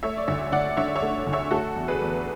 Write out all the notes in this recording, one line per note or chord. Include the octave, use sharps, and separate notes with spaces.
A3 C#5 E5
D5
D2 C#5 E5
D2 D5 F#5
D3 C#5 E5
C#5 E5
A3
D2
C#5 E5
A3 F#4 A4
E2
G#4 B4
E2